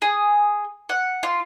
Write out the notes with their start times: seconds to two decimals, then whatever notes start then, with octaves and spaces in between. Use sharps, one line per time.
0.02 G#4
0.89 F#5
1.23 F4